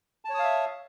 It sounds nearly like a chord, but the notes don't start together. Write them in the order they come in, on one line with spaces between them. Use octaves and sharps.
A5 C#5 D#6 F5 E5